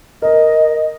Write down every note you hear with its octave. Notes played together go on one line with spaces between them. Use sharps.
A#4 D#5